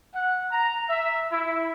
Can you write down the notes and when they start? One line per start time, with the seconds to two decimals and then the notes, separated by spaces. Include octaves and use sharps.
0.13 F#5
0.50 A#5
0.89 E5
1.32 E4